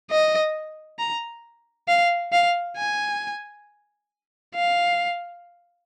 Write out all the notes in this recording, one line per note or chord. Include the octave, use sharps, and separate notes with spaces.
D#5
A#5
F5
F5
G#5
F5